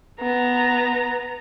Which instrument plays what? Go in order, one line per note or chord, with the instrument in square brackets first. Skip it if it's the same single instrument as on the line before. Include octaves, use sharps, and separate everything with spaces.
[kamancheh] B3 A#5